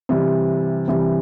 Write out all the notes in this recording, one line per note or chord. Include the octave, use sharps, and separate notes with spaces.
C3 E3 G3
C3 E3 G3